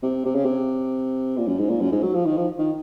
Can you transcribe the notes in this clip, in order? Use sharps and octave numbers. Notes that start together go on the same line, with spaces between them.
C3
C3
C#3
C3
A#2
F#2
G#2
A#2
F#2
G#2
F#3
F3
D#3
F3
D#3